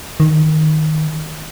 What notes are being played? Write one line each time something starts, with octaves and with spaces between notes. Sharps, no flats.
D#3